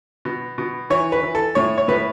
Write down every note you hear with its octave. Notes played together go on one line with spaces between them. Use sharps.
B2
B2
E3 C#5
B4
E3
A4
A2 C#5
C#5
A2 B4